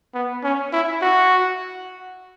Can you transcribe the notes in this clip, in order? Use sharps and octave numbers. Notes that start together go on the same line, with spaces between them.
B3
C#4
E4
F#4